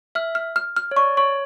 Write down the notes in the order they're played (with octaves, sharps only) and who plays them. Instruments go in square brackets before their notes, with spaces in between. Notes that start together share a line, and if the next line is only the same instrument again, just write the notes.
[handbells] E5 [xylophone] F6
[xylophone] F6
F6
F6
[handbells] C#5
[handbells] D5 [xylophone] C#6
[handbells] C#5 [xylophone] C#6